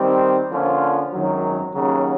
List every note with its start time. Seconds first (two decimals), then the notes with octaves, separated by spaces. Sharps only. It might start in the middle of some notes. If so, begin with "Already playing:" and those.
Already playing: D#3 G3 C4
0.51 D3 F3 A#3 C#4 F4
1.12 G#1 F#2 D#3 F#3
1.73 D#2 C#3 F#3